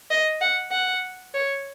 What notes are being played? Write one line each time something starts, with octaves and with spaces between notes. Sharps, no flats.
D#5
F#5
F#5
C#5